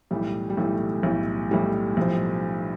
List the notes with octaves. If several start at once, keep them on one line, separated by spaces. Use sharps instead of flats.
B1 A2 E3 G3
G3
B1 A2 E3 A3
B1 A2 E3
B1 A2 E3 G3
B1 A2 F3